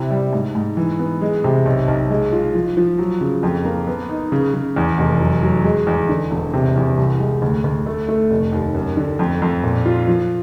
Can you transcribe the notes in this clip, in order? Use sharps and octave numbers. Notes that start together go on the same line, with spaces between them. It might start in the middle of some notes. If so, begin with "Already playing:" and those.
Already playing: C3 E4
G3
G#2
G#2
E3
B3
G#3
C3
B1
B1
G#3
F4
F3
F3
F#3
C#3
F2
A#3
B3
D#4
C#3
C#3
E2
F1
F#3
F#3
G#3
E2
D3
E1
C3
E2
C2
G#3
D2
D2
A3
A3
F1
D#2
F#2
D3
F2
F2
A#2
F4
F3